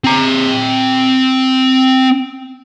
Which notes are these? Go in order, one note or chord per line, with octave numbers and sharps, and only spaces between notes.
C4 A#5